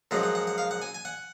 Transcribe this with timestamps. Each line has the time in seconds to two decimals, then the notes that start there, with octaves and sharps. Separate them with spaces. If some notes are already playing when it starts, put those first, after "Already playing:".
0.11 F#2 F3 G#3 F#5
0.23 F#5
0.35 F#5
0.47 F#5
0.58 F5
0.71 F#5
0.82 G#5
0.94 G#5
1.05 F#5